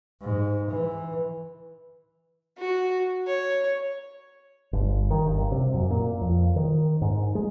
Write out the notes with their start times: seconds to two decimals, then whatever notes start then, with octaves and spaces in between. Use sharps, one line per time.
0.22 G#2
0.71 E3
2.58 F#4
3.27 C#5
4.73 G1
5.10 D#3
5.26 G1
5.52 C3
5.74 F#2
5.90 A#2
6.21 F2
6.56 D#3
7.01 G#2
7.35 G#3